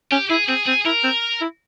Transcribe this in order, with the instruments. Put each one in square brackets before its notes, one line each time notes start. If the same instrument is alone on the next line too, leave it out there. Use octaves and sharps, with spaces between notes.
[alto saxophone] C#4 [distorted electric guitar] G4
[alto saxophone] E4 [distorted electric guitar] G#4
[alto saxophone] C4 [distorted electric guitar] G#4
[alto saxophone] C4 [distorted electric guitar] G#4
[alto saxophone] E4 [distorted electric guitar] A#4
[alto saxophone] C4
E4